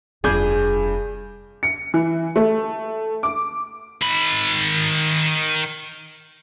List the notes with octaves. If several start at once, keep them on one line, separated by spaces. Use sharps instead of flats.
F1 G2 F4 G#4 D6 G6
C#7
E3
A3
D6
D#3 B5